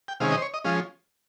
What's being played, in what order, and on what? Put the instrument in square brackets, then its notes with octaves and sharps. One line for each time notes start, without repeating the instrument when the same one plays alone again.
[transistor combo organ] G5
C3 D#3 G#3 C#4 F5
D#5
C5
C#5
D#5
F3 G#3 C#4 F5